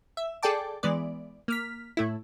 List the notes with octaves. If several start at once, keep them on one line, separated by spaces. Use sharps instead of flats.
E5
G#4 A4 D5 G5 A5 D6
E3 G#3 B3 D5
A#3 F6 B6
A2 A3 E4